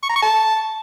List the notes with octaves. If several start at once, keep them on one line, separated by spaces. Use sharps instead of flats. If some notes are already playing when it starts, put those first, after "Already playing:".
C#6
A#5
C#6
A5